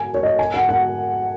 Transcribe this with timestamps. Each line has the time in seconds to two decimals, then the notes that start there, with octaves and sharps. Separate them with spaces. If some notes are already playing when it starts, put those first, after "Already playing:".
Already playing: G#5
0.14 C#5
0.23 D#5
0.39 G#5
0.54 F#5
0.69 F#5